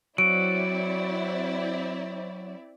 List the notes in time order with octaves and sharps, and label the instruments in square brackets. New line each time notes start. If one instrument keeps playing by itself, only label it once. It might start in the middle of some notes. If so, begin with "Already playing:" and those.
[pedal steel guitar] F#3 [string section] C4 E4 D5 [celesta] D7